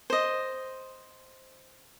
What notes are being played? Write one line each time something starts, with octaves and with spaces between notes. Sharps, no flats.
C5 D#5